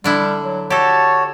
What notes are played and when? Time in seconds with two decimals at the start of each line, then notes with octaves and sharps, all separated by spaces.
0.04 D3 G3 D4 E4
0.42 F#3
0.70 F#4 G4 A4 C#5 A5